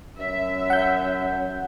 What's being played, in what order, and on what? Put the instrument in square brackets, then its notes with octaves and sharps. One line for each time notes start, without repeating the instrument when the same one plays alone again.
[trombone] F#2 [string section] E5
[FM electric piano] F#5 G6